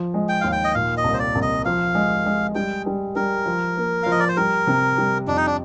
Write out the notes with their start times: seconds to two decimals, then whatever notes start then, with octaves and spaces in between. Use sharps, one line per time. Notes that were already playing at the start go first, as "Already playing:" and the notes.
Already playing: F3
0.14 G#3
0.29 G5
0.41 D#2 F5
0.52 G5
0.64 D#5
0.74 A#2 F5
0.97 D#5
1.04 C2
1.14 C5
1.19 D5
1.35 C2
1.42 D#5
1.65 F3 F5
1.95 G#3
2.26 G#3
2.55 G3 G5
2.86 G3
3.15 G3 A#4
3.46 F3
3.77 A#3
4.03 F3 F5
4.11 D#5
4.20 D5
4.29 C5
4.36 G3 A#4
4.67 C3
4.98 G3
5.27 F2 D4
5.37 D#4
5.46 D4